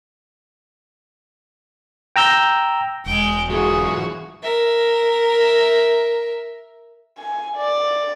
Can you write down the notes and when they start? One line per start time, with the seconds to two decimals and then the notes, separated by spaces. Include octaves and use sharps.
2.16 G5 A#5 E6 G6
3.06 E1 G#3 G5
3.50 E3 F#3 F#4 G#4
4.43 A#4 E5
7.19 G#5
7.56 D5